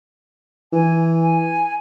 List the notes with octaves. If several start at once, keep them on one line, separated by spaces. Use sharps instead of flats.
E3 G#5
G#5